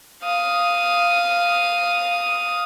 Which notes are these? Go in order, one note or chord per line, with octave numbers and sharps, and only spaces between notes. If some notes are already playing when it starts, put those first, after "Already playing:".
F5 D#6